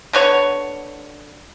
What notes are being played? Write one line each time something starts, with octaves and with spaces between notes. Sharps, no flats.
D3 B3 C#5